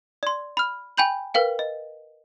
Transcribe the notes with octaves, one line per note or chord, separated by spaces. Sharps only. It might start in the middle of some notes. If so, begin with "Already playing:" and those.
D5 C6
B5 F6
G5 G#5 B5 G6 F#7
A#4 B4 F5 G5
D#5